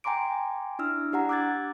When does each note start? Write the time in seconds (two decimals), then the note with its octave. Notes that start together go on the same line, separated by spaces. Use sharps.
0.04 G5 G#5 A#5 C6 D6 D7
0.79 D4 E4 E6 F6
1.12 D4 G4 F#5 A#5
1.29 D6 E6 F#6 G#6 A6